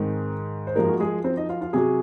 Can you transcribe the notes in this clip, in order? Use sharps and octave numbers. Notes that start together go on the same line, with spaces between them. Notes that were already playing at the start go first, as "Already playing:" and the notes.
Already playing: G#2 D#3 G#3 C4
C5
F#2 F3 G#3 A#3 A#4
F#4
G#3 G#4
C4 C5
D#4 D#5
F4 F5
F4 F5
C3 F#3 G#4 G#5